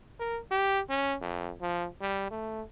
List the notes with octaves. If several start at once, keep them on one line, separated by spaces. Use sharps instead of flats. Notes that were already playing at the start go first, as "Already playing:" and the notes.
A#4
G4
C#4
F2
F3
G3
A3